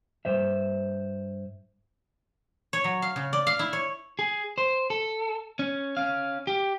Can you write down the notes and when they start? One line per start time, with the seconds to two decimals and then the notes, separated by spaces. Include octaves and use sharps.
0.25 G2 C5 E5
2.73 C#5
2.84 F#3
3.02 F5
3.16 C#3
3.33 D5
3.47 F5
3.59 E4
3.73 C#5
4.19 G#4
4.58 C5
4.90 A4
5.59 C#4
5.97 C#4 F5
6.47 G4